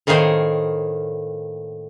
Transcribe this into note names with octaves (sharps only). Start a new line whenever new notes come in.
A2 D#3 A#3 G#4 C5 C#5